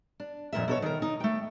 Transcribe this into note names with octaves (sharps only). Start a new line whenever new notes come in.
D4
F2 A#2 A#4 E5
B2 A4 C#5
D#3 A#4
D#4
A3 G5